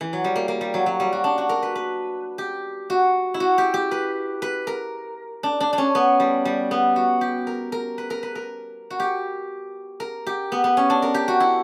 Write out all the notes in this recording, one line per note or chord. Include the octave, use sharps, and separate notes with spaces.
E3
F#3
G3
A#3
A#3
G3
F#3
F#3
G3
F#4
D4
F#4
A#4
B4
B4
G4
F#4
E4
F#4
G4
G4
B4
B4
A#4
D4
D4
D4
C#4
B3
G3
G3
B3
F#4
G4
A#4
A#4
B4
A#4
B4
A#4
F#4
G4
A#4
G4
B3
B3
C#4
D4
A#4
G4
F#4
E4